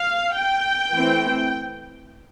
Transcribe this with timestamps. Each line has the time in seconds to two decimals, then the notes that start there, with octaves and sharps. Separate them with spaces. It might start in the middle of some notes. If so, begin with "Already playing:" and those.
Already playing: F5
0.36 G5
0.91 E3 A3 C4